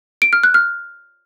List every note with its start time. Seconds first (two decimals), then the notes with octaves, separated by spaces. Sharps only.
0.22 D7
0.33 F6
0.43 F#6
0.54 F6